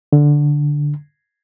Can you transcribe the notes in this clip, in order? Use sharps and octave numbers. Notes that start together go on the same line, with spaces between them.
D3